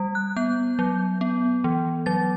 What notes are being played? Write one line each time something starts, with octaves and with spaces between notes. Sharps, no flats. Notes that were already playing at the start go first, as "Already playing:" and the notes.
Already playing: G3
F#6
B3 G6
F#3
B3
E3
F#3 A6